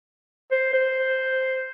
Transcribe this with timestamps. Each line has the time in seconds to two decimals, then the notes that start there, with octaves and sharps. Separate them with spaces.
0.52 C5
0.73 C5